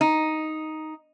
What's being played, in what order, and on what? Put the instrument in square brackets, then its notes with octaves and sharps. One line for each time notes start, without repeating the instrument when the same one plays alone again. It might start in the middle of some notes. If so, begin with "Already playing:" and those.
[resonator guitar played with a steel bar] D#4